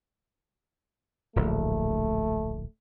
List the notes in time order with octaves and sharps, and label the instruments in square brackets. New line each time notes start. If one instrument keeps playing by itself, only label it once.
[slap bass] D1 A#1 [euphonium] A3